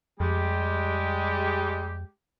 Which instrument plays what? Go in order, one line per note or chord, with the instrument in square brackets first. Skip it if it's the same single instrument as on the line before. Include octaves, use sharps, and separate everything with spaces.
[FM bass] F2 [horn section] G3 G#3 G4